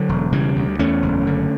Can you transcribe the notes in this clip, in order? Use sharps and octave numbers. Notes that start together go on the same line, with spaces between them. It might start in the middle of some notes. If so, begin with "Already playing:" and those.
Already playing: D3 F#3
E1
C#3 E3 G3
D2
E2 A3 C#4
F#1
D3